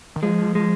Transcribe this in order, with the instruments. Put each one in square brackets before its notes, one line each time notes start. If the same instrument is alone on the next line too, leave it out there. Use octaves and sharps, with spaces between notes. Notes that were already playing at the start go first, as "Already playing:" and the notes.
[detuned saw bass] D#3
[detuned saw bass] F3 [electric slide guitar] G#3
[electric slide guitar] G#3